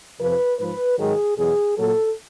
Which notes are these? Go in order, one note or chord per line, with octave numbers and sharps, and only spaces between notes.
F2 C3 F3 B4
G#2 F3 B4
G#2 D#3 F#3 G#4
E2 B2 F#3 G#4
A#2 F#3 A4